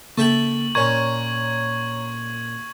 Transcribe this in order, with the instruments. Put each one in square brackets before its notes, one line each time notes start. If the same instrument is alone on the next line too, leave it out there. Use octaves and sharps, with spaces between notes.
[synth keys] C#3 A#3 [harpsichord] A4 E5 G5 [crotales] C#6 F#7
[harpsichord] A#2 C#4 [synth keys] C#5 A#5 [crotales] C#6 G#6